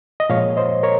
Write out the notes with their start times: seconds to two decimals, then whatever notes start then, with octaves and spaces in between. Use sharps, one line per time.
0.20 D#5
0.29 A#2 F3 G#3 C#5 F5
0.57 C5 D#5
0.83 A#4 C#5